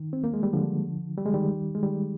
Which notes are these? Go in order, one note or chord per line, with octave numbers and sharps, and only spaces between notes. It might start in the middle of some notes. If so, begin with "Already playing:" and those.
Already playing: D#3
C4
A#3
G#3
G3
D3 F3
G3
G#3
D#3 G3
G#3
D#3 G3